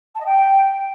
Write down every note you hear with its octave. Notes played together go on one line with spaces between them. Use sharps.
A5
D#5
G5